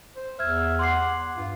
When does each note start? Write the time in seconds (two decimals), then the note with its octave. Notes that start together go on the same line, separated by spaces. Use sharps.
0.16 C5
0.39 E2 E5 F6 G#6
0.79 F#5 C6 D6 C7
1.37 G2 F4